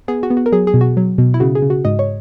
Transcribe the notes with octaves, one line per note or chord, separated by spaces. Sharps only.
B3 G#4
F#4
B3
F#4
A#4
F#3 G#4
G#4
B2
F#4
F#3
B2
E4
C#3 F#4
G#4
C#3
F#4
G#2 D#5
C#5